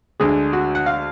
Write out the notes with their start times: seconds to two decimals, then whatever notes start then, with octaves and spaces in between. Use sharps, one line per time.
0.20 D2 D3 G#3 D4 G#4
0.53 F#4
0.75 F#5
0.86 F5